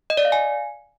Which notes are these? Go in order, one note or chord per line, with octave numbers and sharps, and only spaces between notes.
D#5
D5
F5
G#5